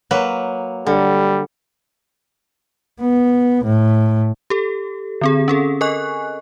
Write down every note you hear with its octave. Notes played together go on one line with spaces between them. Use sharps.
F#3 A#3 B4
D3 G3
B3
A2
G4 A4
D3 C4 G#4
C#4 G#4 A4
A4 A#4 D#5 G#5 C#6 F#6